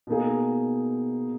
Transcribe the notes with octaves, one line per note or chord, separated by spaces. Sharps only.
B2 A#3 D#4 G#4